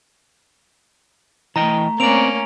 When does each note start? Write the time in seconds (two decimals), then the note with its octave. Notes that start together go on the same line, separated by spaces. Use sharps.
1.56 E3 A3 D#5 G5 A#5
2.00 A3 A#3 C4 C#4 D5 D7 F7